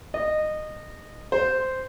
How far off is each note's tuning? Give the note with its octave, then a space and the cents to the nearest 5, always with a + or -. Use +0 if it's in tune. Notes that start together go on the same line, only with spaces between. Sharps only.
D#5 -20
C5 -10